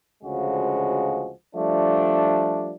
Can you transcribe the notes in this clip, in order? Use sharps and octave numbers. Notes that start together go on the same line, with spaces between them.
D2 C#3 F3 G#3 F#4
F3 G3 A3 D4